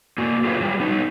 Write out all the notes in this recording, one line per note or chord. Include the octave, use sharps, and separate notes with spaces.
A#3 F#4
F4 G4 G#4 B4 C#5 F5
F#3 G3
B3 D#4